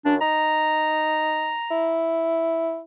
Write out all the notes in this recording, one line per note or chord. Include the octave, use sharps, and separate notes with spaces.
F#2 D4
D#4 A#5
E4